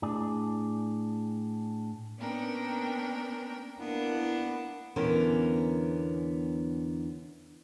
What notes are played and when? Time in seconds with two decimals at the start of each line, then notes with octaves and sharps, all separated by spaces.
0.02 A2 D4 G#4 D5
2.19 A#3 B3 C#4 D4 A#4 G5
3.79 A#3 B3 D4 E4
4.96 E2 D3 B3 C#4 A#4